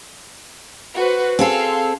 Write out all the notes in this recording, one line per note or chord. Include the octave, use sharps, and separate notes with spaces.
F#4 B4 C5
C4 G#4 A4 F5 C6